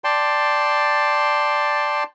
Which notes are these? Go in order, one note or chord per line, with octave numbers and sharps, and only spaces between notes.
D5 G5 A5 C6